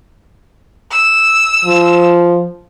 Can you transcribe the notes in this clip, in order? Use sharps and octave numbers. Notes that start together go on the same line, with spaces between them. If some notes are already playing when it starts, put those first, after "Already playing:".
E6
F3